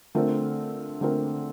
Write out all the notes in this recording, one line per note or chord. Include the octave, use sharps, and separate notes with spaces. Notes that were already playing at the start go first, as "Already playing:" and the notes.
D3 A3 C4 F4 A#4
D3 A3 C4 F4 A#4